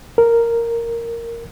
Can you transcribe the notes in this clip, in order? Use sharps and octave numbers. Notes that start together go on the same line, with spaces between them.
A#4